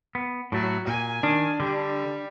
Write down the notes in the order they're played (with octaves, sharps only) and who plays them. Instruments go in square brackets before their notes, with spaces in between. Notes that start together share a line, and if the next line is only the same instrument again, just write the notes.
[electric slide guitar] B3
[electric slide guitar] A2 A3 [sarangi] F#3
[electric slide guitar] A#2 [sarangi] G#5
[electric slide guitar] D#3 [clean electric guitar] D4
[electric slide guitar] D3 [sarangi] G3